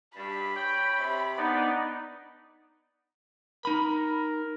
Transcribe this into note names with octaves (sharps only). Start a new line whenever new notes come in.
G2 B5
C#5 G5
C3
B3 D4 D#4 D5 G#5
D#4 A#4 B5